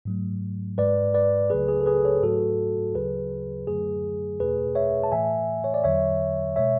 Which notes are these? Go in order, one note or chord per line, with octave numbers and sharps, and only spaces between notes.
G#2 F#3 A3
G#2 G#3 B4 D5
B4 D5
C#2 C#3 F#3 A3 G#4 B4
G#4
A4
G#4 B4
A4 C#5
G#2 F#3 A3 F#4 A4
D2 C#3 F#3 G#4 B4
F#2 D3 F#3 A3 G#4
E2 B2 A3 G#4 B4
C#5 E5
A5
A2 E3 A3 E5 G#5
C#5
D5
E2 D3 F#3 C#5 E5
B2 G#3 C#5 E5